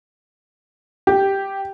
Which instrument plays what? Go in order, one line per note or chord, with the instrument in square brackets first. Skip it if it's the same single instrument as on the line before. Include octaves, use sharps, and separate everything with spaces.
[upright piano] G4